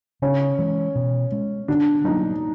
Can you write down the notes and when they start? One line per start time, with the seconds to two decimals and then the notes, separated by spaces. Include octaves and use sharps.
0.22 C#3 C#4
0.59 E3 G#3
0.95 B2
1.32 G#3 C#4
1.68 D3 D4
2.04 F#3 A#3 D#4